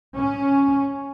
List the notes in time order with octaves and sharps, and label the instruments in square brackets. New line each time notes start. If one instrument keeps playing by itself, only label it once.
[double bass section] C#4